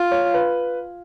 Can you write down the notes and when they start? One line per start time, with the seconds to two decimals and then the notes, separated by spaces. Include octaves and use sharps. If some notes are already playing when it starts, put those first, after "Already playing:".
Already playing: F4
0.12 C#5
0.34 B4